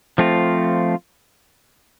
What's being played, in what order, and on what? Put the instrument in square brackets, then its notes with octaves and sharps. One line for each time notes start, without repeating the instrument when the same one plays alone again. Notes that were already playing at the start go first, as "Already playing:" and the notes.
[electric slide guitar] F3 A3 C4 F4